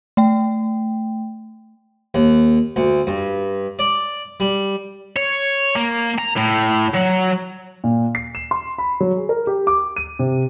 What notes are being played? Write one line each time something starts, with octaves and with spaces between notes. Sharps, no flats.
A3 G5
D#2
D2
G2
D5
G3
C#5
A#3
A#5
A2
F#3
A#2
C7
E7
C6
B5
F#3
G#4
A#4
G4
D6
D#7
C3